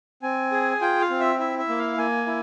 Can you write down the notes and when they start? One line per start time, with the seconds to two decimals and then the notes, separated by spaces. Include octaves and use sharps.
0.23 C4 G#5
0.52 G#4
0.81 F4 G5
1.00 F5
1.10 C4
1.20 E5
1.39 E4 E5
1.59 E5
1.69 A#3
1.78 F5
1.98 A#3 G#5
2.27 E4